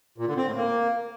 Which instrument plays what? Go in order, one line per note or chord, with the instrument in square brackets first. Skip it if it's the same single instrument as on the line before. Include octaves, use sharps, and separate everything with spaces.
[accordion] A#2
D3
C4
A2
A#3